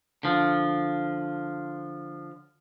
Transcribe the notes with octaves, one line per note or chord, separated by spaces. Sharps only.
D3 F3